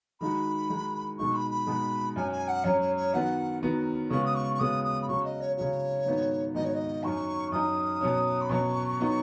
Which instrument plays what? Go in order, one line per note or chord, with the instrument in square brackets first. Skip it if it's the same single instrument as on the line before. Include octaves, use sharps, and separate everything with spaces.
[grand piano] D#3 G#3 D#4 F#4 [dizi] B5
[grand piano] D#3 G#3 D#4 F#4
[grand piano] B2 G#3 D#4 F#4 [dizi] C#6
[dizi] B5
B5
[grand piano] B2 G#3 D#4 F#4
[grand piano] F#2 F#3 C#4 [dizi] G#5
[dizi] G#5
F#5
[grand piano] F#2 F#3 C#4 [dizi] C#5
[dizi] C#5
C#5
[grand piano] D#3 B3 F#4 [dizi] F#5
[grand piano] D#3 B3 F#4
[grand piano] C#3 G#3 B3 F#4 [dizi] C#6
[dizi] D#6
C#6
C#6
[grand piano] C#3 G#3 B3 F#4 [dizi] D#6
[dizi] D#6
B5
[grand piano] C#3 F#3 C#4 F#4 [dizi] C#6
[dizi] D#5
C#5
[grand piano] C#3 F#3 C#4 F#4 [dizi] C#5
[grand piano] G#2 D#3 B3 D#4 F#4
[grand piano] G#2 D#3 B3 D#4 F#4 [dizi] D#5
[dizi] C#5
D#5
[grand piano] F#2 F#3 D#4 [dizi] C#6
[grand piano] F#2 F#3 D#4 [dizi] D#6
[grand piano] B2 F#3 C#4
[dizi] B5
[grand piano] B2 F#3 C#4 [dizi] C#6
[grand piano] F#3 B3 D#4 F#4